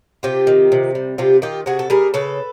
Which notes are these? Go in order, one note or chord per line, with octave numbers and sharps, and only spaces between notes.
C3 F4 G4
D#3
C3
G3
C3 F4 G4
D#3 F4 G4
C3 F#4 G#4
A4
G3 G#4 A#4
C#3 A4 B4